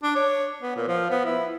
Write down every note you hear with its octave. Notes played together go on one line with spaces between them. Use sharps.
D4
C#5
B3
A#2
F3
B3
E4